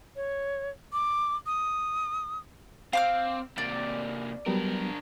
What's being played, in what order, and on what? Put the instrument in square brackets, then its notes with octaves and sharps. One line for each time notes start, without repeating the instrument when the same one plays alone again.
[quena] C#5
D6
D#6
[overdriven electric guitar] C4 [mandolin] F5 D6 F6
[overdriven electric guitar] C3 A#3 [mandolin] D5
[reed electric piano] F#3 G3 B3 [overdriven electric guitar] D4 A#4